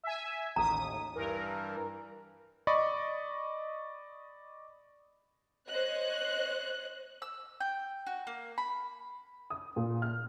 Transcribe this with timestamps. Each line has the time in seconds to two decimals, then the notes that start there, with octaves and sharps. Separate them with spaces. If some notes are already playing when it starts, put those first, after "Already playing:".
0.03 E5 G#5
0.56 A1 D#2 A#5 D#6
1.15 G2 E3 A#4
2.67 D5 D#5 B5 C#6
5.68 C5 C#5 D#5 F#6
7.22 E6
7.60 G5
8.06 F#4
8.27 A#3
8.58 B5
9.50 D#6
9.76 A#2
10.02 F6